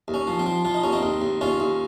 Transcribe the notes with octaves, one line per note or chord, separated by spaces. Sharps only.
D#2
C#4
F3
C4
F3
F3 F4
D#4
D#2 C#4
C4 D#4
D#2
D#2
D#2 C#4 F4
D#2